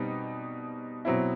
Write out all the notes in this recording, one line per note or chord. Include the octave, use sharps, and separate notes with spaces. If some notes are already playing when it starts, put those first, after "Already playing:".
Already playing: B2 G3 C4 D#4
B2 F#3 C4 E4